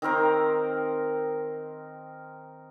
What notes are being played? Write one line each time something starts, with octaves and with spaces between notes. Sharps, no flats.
D#3 C4 A#4 C5